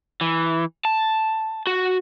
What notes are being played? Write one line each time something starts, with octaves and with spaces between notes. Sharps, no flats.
E3
A5
F#4